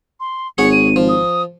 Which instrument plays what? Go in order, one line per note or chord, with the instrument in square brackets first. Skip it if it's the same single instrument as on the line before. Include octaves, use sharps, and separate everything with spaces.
[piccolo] C6
[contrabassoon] G#1 [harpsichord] G#4 C#5 F#5 [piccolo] C#7
[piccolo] D#7
[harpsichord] F3
[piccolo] D#6